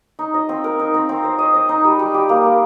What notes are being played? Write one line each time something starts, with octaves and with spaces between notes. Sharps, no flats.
D#4
D#5
C4
A#4
D#4
C4
C4
C5
D#5
D#5
D#4
G3
G3
G4
A#3
A#3